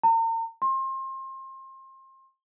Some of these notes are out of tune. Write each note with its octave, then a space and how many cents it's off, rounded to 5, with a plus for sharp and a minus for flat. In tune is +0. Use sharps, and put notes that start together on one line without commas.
A#5 -40
C6 +30